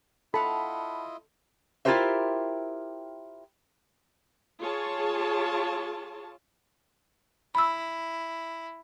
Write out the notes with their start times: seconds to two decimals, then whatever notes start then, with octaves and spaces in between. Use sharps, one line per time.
0.34 E4 F4 A4 D#5 F5 F#5 A5 B5
1.85 E4 F4 G4 A#4 C5 E5
4.59 F4 G#4 C#5 A5
7.55 E4 B5 E6